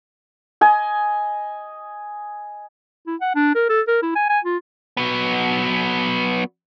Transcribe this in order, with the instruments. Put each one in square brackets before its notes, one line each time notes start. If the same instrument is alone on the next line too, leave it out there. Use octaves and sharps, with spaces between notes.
[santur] D#5 G#5
[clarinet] E4
F#5
D4
A#4
A4
A#4
E4
G#5
G#5
F4
[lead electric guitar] F#3 B3